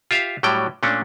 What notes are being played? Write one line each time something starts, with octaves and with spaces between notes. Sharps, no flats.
F4 G4 E5 F5
A2 F#3 G3 G5
A#2 A3 C#4 D4